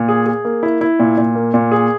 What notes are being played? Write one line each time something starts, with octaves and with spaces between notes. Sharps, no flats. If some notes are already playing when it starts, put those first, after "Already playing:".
Already playing: A#2
G#4
G#4
A#3
E4
E4
A#2
A#2
A#3
A#2
G#4